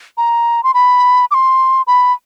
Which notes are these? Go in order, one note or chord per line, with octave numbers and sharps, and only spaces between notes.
A#5
C6
B5
D6
C6
B5